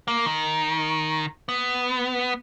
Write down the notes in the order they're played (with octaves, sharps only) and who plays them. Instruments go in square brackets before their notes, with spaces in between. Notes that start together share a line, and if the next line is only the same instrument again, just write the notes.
[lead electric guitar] A#3
D#3
B3